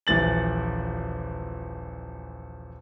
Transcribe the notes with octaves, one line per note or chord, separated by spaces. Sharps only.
D#1 A#1 E3 A6 F#7